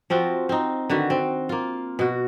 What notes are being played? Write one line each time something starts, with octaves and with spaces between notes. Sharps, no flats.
F3 C4 F4 F#4
C4 D#4
D3 D#3 F#4 B4
C4
A#3 F4
B2 F#4